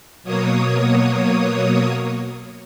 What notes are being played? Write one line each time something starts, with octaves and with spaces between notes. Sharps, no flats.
B2 F#3 A#3 C#5 D#6